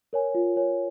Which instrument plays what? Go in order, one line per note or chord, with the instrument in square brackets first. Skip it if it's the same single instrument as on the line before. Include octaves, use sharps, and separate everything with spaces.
[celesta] A#4 C#5 G#5
F4
A#4 C#5 G#5